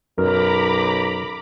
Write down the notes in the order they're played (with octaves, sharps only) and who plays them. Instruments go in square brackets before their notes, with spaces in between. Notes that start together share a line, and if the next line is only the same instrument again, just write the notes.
[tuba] B1 [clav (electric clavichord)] F#2 [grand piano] A#4 [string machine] A#5 B5 D6